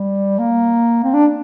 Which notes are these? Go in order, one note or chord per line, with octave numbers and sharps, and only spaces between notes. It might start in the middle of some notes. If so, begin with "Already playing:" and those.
Already playing: G3
A#3
C4
D4